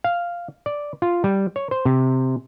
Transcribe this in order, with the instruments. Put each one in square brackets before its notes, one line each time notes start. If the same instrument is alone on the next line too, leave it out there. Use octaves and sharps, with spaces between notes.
[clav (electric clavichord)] F5
D5
F4
G3
C#5
C5
C3